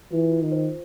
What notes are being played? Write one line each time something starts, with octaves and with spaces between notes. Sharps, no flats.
E3 F4
F4
D#3
C5